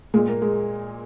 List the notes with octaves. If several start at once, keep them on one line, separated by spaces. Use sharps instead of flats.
A#2 G#3
A#3
G#3